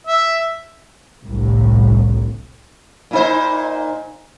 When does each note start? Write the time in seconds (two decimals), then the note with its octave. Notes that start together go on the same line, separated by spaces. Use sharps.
0.07 E5
1.22 G1 C2 A2
3.11 A#2 D#4 C5